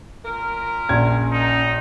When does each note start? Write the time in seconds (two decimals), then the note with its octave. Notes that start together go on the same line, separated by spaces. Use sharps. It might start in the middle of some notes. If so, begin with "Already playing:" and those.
0.25 A#2 A#4
0.89 A#1 C#4 G#6
1.32 D#4